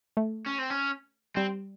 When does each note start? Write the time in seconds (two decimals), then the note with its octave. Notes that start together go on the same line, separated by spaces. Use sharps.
0.17 A3
0.46 C#4
0.58 C4
0.70 C#4
1.36 G3 C4